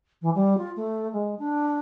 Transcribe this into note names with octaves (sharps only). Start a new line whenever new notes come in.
E3
G3
F4
A3
G#3
D4